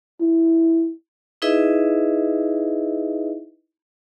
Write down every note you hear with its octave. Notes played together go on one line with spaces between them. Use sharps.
E4
D#4 E4 G#4 B4 D#5 E5